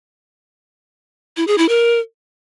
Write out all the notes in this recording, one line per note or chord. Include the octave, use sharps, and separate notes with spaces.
E4
G#4
E4
A#4